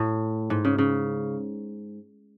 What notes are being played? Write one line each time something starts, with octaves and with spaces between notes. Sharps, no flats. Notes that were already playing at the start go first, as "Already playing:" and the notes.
Already playing: A2
G#2
C#3
C#3